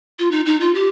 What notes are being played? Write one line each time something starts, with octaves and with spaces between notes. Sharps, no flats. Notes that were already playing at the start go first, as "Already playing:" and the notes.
F4
D#4
D#4
F4
G4